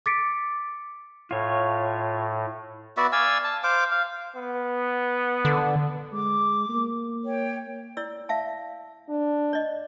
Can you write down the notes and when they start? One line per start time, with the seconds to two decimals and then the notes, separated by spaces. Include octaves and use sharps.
0.06 D6 A6 B6 C#7 D7
1.31 A2 F4 C#5
2.97 B3 F#4 D5 E5
3.12 D5 F5 G#5 E6
3.44 A5
3.64 C5 F5 D6
3.92 F5
4.36 B3
5.45 D3
6.12 G#3 D6
6.69 A#3
7.25 C#5 G5
7.97 E4 D5 E6
8.29 E5 F5 A5
9.09 D4
9.53 D5 D#5